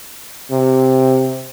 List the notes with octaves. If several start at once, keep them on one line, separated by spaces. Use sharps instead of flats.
C3